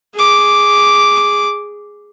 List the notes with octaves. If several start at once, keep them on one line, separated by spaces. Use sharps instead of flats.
G#4 D6